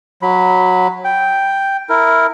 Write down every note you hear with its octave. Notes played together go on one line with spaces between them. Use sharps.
F#3 B5
G5
E4 A#4